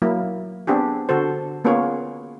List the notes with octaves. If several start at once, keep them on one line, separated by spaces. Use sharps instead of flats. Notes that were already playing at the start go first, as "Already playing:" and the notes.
F#3 A#3 E4
B3 C4 D4 G4 G#4
D3 F#4 A4 C5
A#3 B3 C#4 F4 G#4 C#5